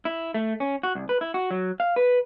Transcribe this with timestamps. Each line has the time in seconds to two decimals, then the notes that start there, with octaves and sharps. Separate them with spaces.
0.05 E4
0.34 A3
0.60 C#4
0.83 F#4
0.95 C2
1.09 B4
1.21 E4
1.34 F#4
1.51 F#3
1.80 F5
1.96 B4